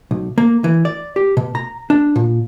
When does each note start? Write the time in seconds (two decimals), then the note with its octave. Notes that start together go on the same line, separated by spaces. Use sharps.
0.11 B1
0.38 A#3
0.64 E3
0.85 D5
1.16 G4
1.37 B2
1.55 A#5
1.90 D4
2.16 A#2